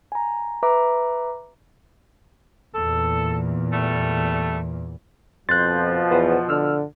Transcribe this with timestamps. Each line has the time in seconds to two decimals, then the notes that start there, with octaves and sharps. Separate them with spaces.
0.12 G#5 A#5
0.63 B4 E5 A#5 D6
2.75 E2 A#2 A4
3.73 G3 A3
5.49 F2 B2 F3 C6 F#6 G6 A6
6.11 E2 B4 C5 F#5
6.49 D3 E6 F6